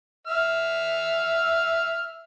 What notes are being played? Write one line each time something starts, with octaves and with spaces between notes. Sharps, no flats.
E5 F6